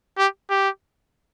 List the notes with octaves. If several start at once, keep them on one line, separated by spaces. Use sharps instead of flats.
G4
G4